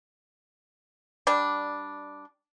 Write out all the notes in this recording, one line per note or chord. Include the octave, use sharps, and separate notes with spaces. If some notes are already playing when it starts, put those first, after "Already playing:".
G3 D4